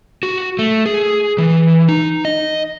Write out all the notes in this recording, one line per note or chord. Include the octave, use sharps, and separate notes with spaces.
F#4
A3
G#4
E3
D#4
D#5